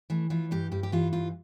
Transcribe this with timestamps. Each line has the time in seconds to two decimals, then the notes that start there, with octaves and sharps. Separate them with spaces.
0.10 E3 A3
0.30 E3 F4
0.51 G2 G4
0.72 G2 G4
0.83 G4
0.92 E3 F4
1.13 G2 F4